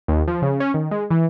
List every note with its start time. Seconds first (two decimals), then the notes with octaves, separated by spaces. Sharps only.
0.08 D#2
0.28 F3
0.42 C#3
0.60 C#4
0.74 D#3
0.91 G#3
1.10 E3